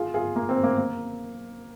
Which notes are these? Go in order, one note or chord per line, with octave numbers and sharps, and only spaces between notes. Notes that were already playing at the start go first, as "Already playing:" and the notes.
Already playing: F4 G#4
F4 G#4
A#3
C4
A#3
A#3